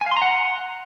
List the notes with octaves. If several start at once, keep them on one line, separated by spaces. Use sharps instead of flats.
G#5
F5
C6
A#5
F#5